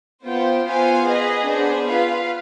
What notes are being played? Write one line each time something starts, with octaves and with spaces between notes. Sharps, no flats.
B3 F4 C5 G5
B3 F4 C5 F5 G#5
G#4 B4 D#5
B3 D4 G#4 C5
F4 B4 F5